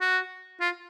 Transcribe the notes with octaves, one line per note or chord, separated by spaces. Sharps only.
F#4
F4